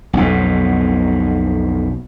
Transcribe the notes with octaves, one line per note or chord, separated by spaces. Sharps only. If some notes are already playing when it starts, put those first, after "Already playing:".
B1 F2 B2